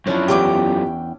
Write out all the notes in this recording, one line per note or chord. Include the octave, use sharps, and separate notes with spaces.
F#2 F3 C#4 D4 E4
E2 E3 G4 G5 D6